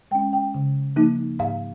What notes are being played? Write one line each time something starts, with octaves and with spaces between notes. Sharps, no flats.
G#3 C#4 G5
G5
C#3
F3 A#3 D#4
G#2 F5